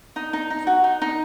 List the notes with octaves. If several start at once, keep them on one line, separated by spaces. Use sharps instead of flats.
D#4
D#4
D#4
F#4
D#4
D#4